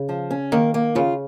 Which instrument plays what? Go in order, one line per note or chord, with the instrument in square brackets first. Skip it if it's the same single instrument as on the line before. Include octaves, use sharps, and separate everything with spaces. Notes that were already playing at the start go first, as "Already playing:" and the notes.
Already playing: [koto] C#3
[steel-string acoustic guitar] F3
C#4
[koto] D#3 [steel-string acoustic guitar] A#3
[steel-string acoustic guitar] A#3
[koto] C#3 [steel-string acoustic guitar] F4